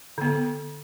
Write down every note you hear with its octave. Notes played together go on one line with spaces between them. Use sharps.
D3 B3